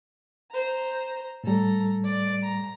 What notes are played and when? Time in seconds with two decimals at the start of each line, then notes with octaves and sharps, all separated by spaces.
0.51 C5 A#5
1.44 A2 G3 A4 A#5
2.04 D5
2.43 A#5